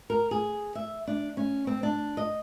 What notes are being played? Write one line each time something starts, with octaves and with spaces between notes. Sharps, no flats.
A#4
G#4
E5
D4
C#4
C4
D4
D#5